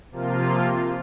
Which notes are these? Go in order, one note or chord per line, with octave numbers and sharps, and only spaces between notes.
C3 F3 A#3 F4